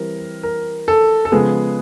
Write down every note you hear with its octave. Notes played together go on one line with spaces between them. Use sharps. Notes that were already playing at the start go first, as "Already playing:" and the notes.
Already playing: E3 G3 C4 A#4
A#4
A4
A4
C#3 F3 G#3 B3 G#4